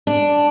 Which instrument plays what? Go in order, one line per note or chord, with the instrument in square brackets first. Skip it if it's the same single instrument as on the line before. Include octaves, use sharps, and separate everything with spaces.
[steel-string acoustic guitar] D4